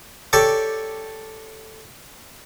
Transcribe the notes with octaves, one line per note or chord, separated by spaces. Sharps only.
G4 A4 C#5 D5